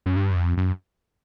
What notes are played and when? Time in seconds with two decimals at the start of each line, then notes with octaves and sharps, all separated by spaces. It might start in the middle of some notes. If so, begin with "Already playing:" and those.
0.06 F#2
0.16 G2
0.31 F#2
0.36 F2
0.57 F#2